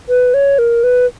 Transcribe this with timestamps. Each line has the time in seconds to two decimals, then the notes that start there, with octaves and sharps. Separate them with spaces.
0.09 B4
0.34 C#5
0.59 A#4
0.84 B4